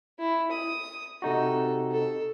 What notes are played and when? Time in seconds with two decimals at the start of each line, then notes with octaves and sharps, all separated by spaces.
0.19 E4
0.51 D#6
1.22 C3 D#4 F#4 A4
1.91 A4